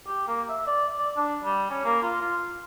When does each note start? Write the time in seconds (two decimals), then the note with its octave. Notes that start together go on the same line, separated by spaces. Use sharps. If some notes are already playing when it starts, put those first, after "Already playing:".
0.07 G4
0.28 A#3
0.49 E5
0.67 D5
0.98 D5
1.17 D4
1.44 G3
1.70 C#4
1.85 A#3
2.02 F4
2.22 F4